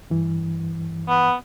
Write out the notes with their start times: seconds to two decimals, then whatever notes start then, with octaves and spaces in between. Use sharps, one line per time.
0.10 G2 E3
1.09 B3